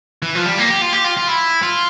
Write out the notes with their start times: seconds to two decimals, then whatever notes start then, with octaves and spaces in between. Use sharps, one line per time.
0.22 E3
0.35 F3
0.46 G3
0.58 A#3
0.70 G4
0.82 F4
0.93 G4
1.04 F4
1.17 F4
1.28 E4
1.62 F4